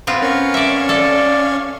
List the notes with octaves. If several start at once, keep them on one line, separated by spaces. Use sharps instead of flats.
B3 C4 F4
C#4 A#4 F5 C#6
D5 E5
A4 D5